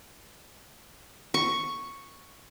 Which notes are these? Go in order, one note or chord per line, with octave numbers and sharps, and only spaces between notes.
C#6